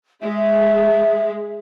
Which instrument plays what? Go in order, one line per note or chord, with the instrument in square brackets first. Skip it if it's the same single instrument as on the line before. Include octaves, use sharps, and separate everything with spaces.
[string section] G#3 [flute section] E5